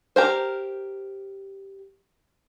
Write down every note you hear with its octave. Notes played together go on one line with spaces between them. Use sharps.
G4 A#4 C5